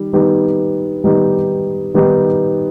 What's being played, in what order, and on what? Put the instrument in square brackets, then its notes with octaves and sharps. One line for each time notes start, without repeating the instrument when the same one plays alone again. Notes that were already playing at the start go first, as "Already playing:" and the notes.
Already playing: [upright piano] D#3 G3
D#3 G3 B3 D#4 G4
D#3 G3 B3 D#4 G4
D#3 G3 B3 D#4 G4